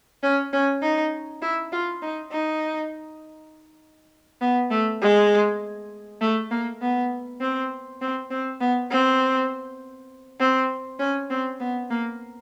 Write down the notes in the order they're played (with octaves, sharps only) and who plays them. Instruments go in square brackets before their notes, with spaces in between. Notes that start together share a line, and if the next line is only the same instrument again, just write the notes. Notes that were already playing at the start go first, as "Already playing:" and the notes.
[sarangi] C#4
C#4
D#4
E4
F4
D#4
D#4
B3
A3
G#3
A3
A#3
B3
C4
C4
C4
B3
C4
C4
C#4
C4
B3
A#3